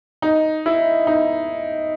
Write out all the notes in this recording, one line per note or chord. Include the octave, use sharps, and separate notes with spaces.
D#4
E4
D#4